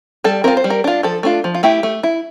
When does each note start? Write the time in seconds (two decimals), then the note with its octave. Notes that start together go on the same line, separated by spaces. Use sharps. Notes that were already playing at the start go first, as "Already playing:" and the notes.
0.24 G3 A4
0.44 C4 F4 A#4
0.57 C5
0.64 G3
0.70 A#4
0.84 D4 F4
1.03 F3 A4
1.23 A3 D4 F4
1.44 F3
1.55 F4
1.63 A3 E4 G4
1.83 A3
2.03 E4